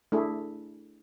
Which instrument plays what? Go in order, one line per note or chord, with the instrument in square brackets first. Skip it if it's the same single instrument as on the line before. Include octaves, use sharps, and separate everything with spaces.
[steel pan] A3 D4 E4 G#4